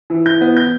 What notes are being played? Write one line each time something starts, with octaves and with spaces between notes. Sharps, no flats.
E3
E3 G6
B3
G6